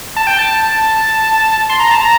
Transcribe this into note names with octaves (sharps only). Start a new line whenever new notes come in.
A5
G5
A5
C6
A#5
A5
A#5